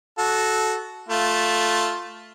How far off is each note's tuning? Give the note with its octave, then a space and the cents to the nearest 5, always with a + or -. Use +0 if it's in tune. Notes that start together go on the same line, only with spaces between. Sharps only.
F#4 +0 A4 -15
A3 +0 F4 +5